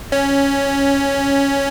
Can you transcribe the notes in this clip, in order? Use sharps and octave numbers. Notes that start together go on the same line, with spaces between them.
C#4